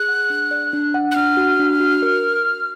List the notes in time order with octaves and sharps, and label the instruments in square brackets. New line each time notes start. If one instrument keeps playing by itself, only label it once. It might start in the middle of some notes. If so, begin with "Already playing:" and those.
Already playing: [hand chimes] G#4 [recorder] F#6
[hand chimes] F#5
D4
D5
D4
F#5
[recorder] F#6
[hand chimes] D4 [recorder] F6
[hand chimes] F#4
D4
F#4
A#4